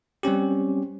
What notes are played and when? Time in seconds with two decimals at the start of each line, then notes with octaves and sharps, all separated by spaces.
0.23 G3 C4 C#4 G4